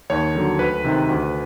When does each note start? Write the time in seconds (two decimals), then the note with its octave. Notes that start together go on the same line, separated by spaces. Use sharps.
0.10 D#2 C#5
0.35 D3 F#3
0.59 D2 B4
0.84 C3 D#3
1.09 D2